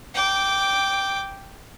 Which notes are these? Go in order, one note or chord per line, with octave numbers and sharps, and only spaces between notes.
G5 D6